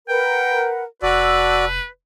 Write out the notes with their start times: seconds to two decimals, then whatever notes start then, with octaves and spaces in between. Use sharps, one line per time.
0.09 A#4 B4 F#5 G5
1.02 F1 F#4 B4 D5 A5 E6